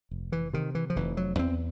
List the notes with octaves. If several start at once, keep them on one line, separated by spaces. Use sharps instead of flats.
F1
E3
C3 D#3
E3
F3
F1 E3
F#3
E2 C4